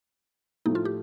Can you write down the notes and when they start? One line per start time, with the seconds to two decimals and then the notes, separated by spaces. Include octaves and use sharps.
0.66 A2 F3 A3 D#4
0.75 F4
0.85 G4